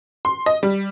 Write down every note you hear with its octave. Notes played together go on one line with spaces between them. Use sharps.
C6
D#5
G3